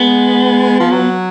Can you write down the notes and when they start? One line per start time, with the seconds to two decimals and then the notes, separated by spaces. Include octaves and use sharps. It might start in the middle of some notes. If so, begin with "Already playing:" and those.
Already playing: G#3 B3
0.80 F3
0.91 F#3